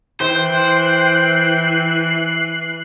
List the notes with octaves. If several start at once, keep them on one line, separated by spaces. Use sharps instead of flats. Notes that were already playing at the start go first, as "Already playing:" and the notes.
E3 C5 G5 F#6 C7